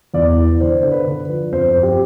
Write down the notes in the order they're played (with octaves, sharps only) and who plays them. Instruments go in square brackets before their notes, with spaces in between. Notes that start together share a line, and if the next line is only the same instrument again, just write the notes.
[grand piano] E2 D5
E3
D3 C5
D3
B4
D3
F3
F2 C5
F2
G4